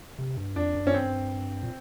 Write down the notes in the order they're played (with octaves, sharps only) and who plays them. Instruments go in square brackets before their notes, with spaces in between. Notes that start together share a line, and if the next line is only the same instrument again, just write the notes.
[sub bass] C3
G2
[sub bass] F2 [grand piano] D4
[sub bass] F#2
[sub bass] F#2 [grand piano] C#4
[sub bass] G2 [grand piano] C4
[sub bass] A#2